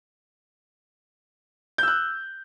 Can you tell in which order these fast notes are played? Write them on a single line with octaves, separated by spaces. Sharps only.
G6 E6 F#6